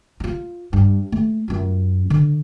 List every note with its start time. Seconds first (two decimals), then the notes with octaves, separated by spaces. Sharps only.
0.20 D#4 F4
0.73 G2
1.12 A3
1.48 F#2 F4
2.10 D3